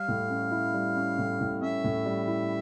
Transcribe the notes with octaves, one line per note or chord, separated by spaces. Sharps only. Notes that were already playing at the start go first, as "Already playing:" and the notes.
Already playing: G3 F5
A2
C#4
E4
G3
C#4
A2
A2
C#4 E5
A2
G3
E4